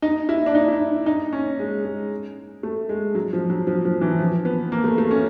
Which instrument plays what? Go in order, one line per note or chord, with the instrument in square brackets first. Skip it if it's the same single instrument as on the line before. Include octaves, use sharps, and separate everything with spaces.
[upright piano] D#4
E4
D4
D#4
E4
D#4
D#4
C#4
G#3
G#3
A3
G#3
F#3
F3
F#3
F3
F3
E3
F3
B3
A#3
A3
A3
C#4